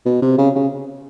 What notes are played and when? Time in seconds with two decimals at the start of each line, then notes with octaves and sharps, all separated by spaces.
0.06 B2
0.22 C3
0.38 C#3
0.55 C#3